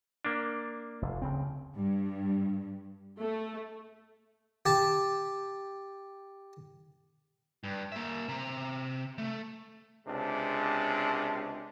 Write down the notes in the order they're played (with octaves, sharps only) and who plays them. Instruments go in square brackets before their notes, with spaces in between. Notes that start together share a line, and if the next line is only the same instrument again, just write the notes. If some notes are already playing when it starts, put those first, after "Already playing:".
[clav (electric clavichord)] A#3 D4
[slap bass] F1
D2 C#3 C4
[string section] G2
A3
[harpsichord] G4 A5
[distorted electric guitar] G2
A#3 E5
C3 A#5
A3
[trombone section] C#2 C3 G#3 D4